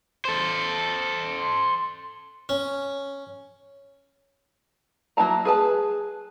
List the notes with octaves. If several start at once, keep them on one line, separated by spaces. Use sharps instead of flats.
A4 C5
C#4
F#3 A#3 E4 A5 A#5
G#4 B4 A5